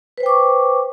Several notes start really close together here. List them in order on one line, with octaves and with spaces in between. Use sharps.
B4 C5 G5 D6 C#6